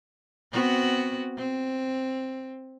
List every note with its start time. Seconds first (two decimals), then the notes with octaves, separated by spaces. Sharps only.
0.52 B3 C4 F#4
1.37 C4